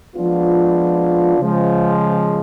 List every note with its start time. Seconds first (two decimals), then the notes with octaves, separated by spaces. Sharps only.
0.15 F3 G#3 B3 D4 F4
1.38 C#3 F3 G#3